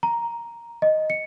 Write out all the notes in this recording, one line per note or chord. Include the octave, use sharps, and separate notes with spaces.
A#5
D#5
C#7